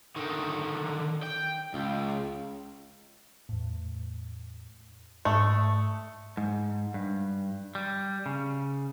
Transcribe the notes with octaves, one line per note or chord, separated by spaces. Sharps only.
D3 D#3
G5
C#2
E2 A2
G#2 A3 D#6 C#7
G#2
G2
G3
C#3